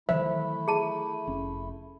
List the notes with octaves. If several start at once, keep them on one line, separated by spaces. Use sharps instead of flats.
D#3 E3 F#3 A3 E4 C5 E5
G#4 A5
F1 C#4